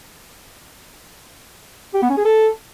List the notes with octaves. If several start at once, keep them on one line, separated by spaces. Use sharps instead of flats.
G4
B3
C#4
G#4
A4